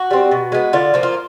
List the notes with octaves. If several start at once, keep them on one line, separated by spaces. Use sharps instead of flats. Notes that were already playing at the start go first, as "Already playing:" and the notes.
Already playing: F#4
G3 C4
B2
G#3 B3
D3 F4
F3 A#3
F4